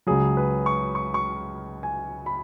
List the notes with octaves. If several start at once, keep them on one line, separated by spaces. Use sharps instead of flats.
C#2 C#3 F#3 G#4
B4
C#6
C#6
C#6
G#5
B5